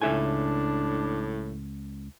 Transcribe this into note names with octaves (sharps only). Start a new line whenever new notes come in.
C#2 A2 D4 E5 G#5